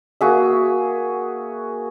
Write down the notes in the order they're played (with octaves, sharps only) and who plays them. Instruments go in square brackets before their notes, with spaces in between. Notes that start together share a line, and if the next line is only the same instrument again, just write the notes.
[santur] A#3 F#4 G#4 E5